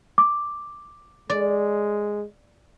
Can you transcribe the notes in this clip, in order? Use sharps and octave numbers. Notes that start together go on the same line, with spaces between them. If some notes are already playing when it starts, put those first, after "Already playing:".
D6
G#3 D5